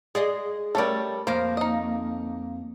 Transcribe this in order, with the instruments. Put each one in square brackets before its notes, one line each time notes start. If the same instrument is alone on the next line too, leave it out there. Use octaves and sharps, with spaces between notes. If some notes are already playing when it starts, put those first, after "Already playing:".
[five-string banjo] G#3 [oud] G#4 D5 D#5
[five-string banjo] G3 C#4 A4 [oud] A3 A#4
[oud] F2 A#3 [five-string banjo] C5
[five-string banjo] D#4 D#5